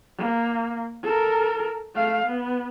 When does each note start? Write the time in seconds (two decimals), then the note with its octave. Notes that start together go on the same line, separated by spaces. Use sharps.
0.18 A#3
1.03 A4 A#4
1.95 A3 F5
2.26 B3